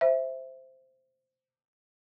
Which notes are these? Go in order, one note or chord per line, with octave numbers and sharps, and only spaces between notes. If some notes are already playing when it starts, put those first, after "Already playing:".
C5 E5